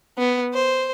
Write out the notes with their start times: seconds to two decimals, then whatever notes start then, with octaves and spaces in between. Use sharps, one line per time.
0.18 B3
0.54 C5